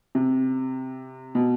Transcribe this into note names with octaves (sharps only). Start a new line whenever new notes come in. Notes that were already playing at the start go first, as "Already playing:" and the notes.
C3
B2